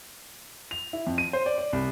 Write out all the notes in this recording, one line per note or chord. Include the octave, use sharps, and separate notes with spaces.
F7
E4
F2
D#7
C5
D5
D5
C2